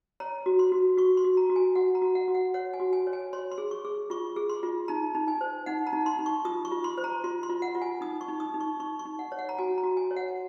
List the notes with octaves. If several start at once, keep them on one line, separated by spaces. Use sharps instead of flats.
C#5 A#5
F#4
C6
F#4
F#4 C#6
C6
F#4
A#5
F#4
G#5
F#4 F#5
A#5
F#4
F#5
F#4
F#5
C#5 F#5
G#5
F#4
G#5
C#5
G#5
C#5 C6
C6
G#4
C#6
G#4
F4 C#6
G#4
C6
F4
D#4 A#5
D#4
G#5
C5
D#4 F#5
A#5
D#4
C6
D#4
C#6
F4 D#6
C#6
F4
C6
C5
A#5
F4 C6
C6
F4
F#5
F4
G#5
D#4 D#6
C#6
D#4
D#6
D#4
C#6
D#4 C#6
C#6
D#4
F#5
C#5
F#5
A#5
F#4 G#5
A#5
F#4
G#5
C#5
F#5